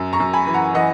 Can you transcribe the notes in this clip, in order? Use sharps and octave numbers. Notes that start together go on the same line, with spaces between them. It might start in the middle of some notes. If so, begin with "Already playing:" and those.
Already playing: F#2
A#5 C#6
F#2
G#5 B5
E3 B5
F#5 A#5
E3 D#5 F#5